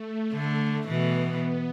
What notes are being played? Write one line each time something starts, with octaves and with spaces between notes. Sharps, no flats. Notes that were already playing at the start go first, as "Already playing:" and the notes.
Already playing: A3
D3
B2 E3 B3